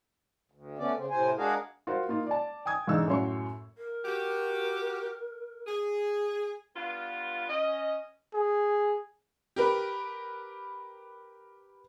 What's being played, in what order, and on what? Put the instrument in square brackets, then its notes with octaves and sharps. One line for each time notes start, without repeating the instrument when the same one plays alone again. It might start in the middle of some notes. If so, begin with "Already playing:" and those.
[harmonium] D2
A3 B3 C#4 D5
C#3 C4
A2 C3 C4 C5 G#5
G#3 D4 F#4 G#4 A#4 F5
[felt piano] F4 F#4 A#4 C5
A#3 D#4 F4
D5 A5
G5 G#5 D#6 G#6
A1 G#2 D3 D#4 E6
F#2 A2 F#3 C#5 C6 C#6
[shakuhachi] A#4
[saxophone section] F#4 G4
G#4
[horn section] G2 B3 F4
C#4 D#5
[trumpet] G#4
[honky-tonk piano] G4 A#4 B4